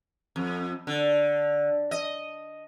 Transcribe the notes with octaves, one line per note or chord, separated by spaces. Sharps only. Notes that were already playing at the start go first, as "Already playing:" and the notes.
F2
D3
D#5